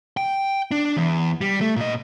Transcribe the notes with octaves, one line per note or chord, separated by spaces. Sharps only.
G5
D4
E2
G3
A3
A#2 D#5